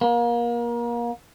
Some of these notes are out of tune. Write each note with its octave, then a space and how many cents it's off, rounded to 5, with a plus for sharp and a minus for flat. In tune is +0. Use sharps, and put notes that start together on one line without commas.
A#3 +30